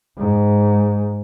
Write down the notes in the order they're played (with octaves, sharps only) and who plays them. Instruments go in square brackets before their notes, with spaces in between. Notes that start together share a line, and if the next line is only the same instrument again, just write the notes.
[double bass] G#2